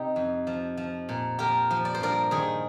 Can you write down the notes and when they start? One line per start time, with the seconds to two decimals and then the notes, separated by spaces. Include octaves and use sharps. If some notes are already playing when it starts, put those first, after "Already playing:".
Already playing: C3 D#4 G4
0.16 F2
0.47 F3
0.77 F3
1.09 A#2
1.39 F3 G4 A#4
1.71 F3
1.85 D5
1.95 C5
2.01 G2 A#4 D5
2.31 D#3 G#4 C5